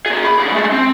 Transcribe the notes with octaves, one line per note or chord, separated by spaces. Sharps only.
A#3 G#4
B5
D3 G#4
G#3 A3
C4